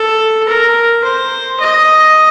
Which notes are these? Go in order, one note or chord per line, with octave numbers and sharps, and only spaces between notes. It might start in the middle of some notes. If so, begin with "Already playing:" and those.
Already playing: A4
A#4
C5
D#5